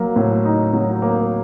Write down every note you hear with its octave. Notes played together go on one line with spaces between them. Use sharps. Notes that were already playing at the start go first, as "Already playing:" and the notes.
Already playing: F#3 A#3
A2
D#4
F#3
A#3